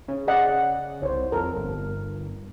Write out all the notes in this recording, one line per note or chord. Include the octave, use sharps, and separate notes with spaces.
C#3
D5 D#5 F#5
C2 C5 C#5
F2 A4 A#4
G1